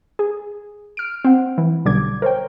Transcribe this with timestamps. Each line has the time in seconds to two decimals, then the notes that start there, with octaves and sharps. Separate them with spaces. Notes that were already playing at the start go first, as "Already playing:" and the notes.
0.19 G#4
0.97 F6 D7
1.24 C4 F#5
1.58 E3
1.85 B1 B2 D3 G3 D6 G#6
2.22 A#4 C5 C#5 G5